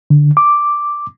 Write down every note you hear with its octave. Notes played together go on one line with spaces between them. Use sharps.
D3
D6